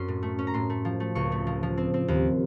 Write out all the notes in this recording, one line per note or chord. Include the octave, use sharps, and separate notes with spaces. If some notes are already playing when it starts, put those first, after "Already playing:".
Already playing: F#2 C#4 C6
A2
A3
C#4
A#5
A2 C6
A3
F3
A3
C#2 C#6
A3
F3
F3
C4
C4
D#2